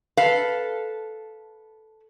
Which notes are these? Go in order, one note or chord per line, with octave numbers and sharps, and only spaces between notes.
A4 B4 F5